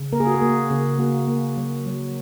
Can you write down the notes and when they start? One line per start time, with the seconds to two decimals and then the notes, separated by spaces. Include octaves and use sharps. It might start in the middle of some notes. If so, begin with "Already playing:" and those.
Already playing: C#3
0.12 A#3 A#4
0.20 G#4
0.27 F#4
0.34 G#4
0.42 A#3
0.70 C#3
0.99 A#3 F#4
1.28 A#3
1.57 F#3
1.86 F#3